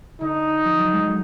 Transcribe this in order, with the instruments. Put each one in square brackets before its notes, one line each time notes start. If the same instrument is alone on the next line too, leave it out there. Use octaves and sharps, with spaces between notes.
[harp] D3 [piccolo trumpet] D#4
[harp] F3
F#3
G#3
F#3